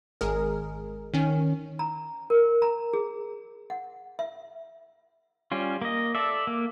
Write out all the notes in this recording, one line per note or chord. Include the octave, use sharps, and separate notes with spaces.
G#1 G#3 G#4 A#4
D#3 C#4
A#5
A#4
A#5
G#4
F#5
E5
G3 C#4 F4
A#3 D#5
A4 D5 E5
A#3